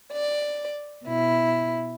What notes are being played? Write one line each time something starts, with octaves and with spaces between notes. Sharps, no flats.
D5
B2 E4